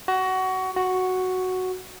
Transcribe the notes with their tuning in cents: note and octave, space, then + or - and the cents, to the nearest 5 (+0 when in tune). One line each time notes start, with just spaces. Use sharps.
F#4 +20
F#4 +0